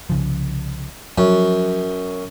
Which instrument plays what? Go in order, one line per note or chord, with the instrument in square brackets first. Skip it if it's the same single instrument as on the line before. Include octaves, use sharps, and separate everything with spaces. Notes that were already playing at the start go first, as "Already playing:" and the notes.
[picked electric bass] C2 C#3 F3
[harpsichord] F#2 [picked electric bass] F3 F#3